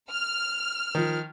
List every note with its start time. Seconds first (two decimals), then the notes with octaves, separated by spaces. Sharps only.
0.12 F6
0.95 D#3 F3